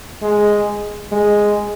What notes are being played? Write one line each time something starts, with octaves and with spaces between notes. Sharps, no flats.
G#3
G#3